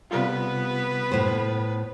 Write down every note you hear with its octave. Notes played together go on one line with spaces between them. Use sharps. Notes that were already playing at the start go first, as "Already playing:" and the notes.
C3 G3 B3 F4 B4
A2 C5